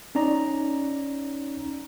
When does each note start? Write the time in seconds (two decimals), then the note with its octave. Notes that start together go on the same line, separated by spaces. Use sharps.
0.15 C#4 D#4 D5 A#5